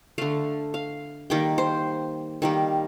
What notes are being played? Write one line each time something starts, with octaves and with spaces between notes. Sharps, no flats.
D3 A3 F5
F5
D#3 G3 A#3 G5
C5
D#3 G3 A#3